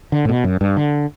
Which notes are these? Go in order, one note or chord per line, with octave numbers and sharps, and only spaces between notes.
D3
A2
B2
F#2
G2
D3